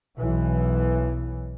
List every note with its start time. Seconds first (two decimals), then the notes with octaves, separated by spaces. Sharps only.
0.18 B1 E3